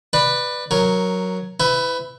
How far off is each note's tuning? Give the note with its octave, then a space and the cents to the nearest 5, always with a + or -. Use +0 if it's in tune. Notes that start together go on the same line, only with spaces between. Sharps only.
B4 +0 D5 +20
F#3 +0 A#4 +5
E4 +0 B4 +30